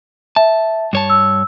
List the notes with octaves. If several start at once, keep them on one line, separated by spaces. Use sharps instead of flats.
E5 A5
G2 C#5 A5
E6